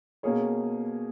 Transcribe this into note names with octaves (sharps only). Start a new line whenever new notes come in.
B2 A#3 C#4 G#4 C#5